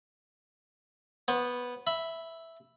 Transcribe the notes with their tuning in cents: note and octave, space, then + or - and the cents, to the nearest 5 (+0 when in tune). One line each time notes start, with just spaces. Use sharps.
B3 -5 C5 +35
E5 +0 B5 +0